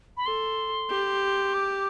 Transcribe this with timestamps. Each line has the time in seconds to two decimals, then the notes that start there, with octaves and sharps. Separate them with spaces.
0.17 B5
0.25 A4 C6
0.90 G4
1.54 D6